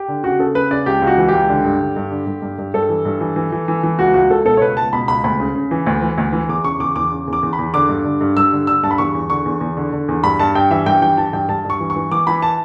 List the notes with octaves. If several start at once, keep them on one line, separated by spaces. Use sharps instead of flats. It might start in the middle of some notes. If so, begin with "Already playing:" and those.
Already playing: G4
D3
C#3 F#4
C#3 A4
C#3 B4
C#3 D5
C#2 G4
C#2
F#4
E3
G4
C#2
D3
G2
D3
G2
D3
G2
G2
G2
G2 A4
E3
G2
E3
E3
E3
E3
E3
C#2 F#4
C#2 F#4
C#2 A4
B2 A4
C#5
C#2 B4
C#2 A5
B2 B5
C#2 B5
D2 B5
C#3
C#3
E3
D2
E3
D2
E3
E2 D6
C#3 C#6
E2 D6
E2 D6
C#3
E2
D6
E2
B5
E2
D3 D6
G2
D3
G2
G2 E6
D3
D3 E6
G2 A5
B5
E2 C#6
E2
D3 C#6
E2
E2
D3
D3
E2
G2 B5
G2 A5
G2 G5
E3 E5
G2 G5
E3 G5
E3 A5
G2 G5
G2 A5
G2 C#6
E3
C#6
E3
E3 D6
E3 B5
A5